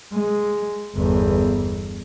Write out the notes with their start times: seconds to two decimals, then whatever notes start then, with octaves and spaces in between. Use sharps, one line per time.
0.12 G#3
0.95 G1 E2